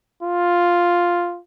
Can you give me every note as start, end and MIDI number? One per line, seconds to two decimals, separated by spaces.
0.23 1.40 65